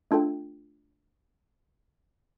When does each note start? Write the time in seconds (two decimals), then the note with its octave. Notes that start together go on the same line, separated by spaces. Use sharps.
0.11 A3 D4 F4 A4 G5